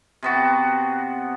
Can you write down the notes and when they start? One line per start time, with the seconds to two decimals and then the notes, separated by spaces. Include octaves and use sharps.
0.23 C3 B3 F#4